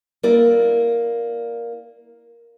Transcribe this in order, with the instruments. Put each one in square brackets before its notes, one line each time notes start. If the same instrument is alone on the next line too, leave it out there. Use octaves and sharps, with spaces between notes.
[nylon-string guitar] A#3 E4 A#4 D5